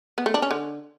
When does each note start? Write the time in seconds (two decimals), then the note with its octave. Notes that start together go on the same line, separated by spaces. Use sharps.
0.18 B3
0.26 A3
0.34 D4
0.42 C#4
0.51 D3